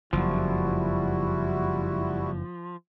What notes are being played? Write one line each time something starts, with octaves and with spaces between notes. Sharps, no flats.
F#1 F2 F3 G3 E4 F#4